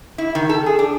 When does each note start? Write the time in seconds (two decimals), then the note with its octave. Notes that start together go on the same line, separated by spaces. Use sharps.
0.18 E4
0.35 D#3
0.49 A4
0.66 G#4
0.79 D4